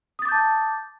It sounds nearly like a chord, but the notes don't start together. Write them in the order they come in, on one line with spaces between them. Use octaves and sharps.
D#6 A6 D6 G6 A5